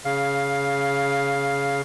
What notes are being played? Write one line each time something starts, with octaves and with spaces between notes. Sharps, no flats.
C#3 F5